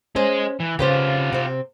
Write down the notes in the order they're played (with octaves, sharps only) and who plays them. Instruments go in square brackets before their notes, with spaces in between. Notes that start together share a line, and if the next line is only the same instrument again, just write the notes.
[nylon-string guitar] C#4 C5 [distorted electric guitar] G#4 D#5
[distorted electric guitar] E3
[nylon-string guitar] C#3 B4 C5 [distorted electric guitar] F4 G4
[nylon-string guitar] C3 C4